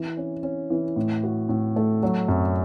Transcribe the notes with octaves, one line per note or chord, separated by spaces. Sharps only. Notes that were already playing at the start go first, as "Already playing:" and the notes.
Already playing: E3
C#4
C#4
E3
A2
F#4
A2
A3
F#3
F#2